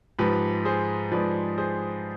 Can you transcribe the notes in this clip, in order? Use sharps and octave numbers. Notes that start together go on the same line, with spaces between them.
G#2 F3 G4 B4
G#4 C5
G#2 F3 B4 D5
G#4 C5